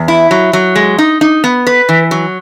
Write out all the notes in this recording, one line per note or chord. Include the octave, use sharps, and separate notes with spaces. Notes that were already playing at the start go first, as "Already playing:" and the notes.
Already playing: E2
E4
F#3
F#3
G#3
D#4
D#4
B3
B4
E3
F#3